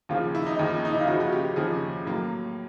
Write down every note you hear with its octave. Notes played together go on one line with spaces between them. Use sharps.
D#2 C#3 F3 F4
E4
D#4
D#2 C#3 F3
D#4
E4
F4
D#2 C#3 F3 F#4
F#4
G4
G4
D#2 C#3 F3 G#4
A2 F#3 A#3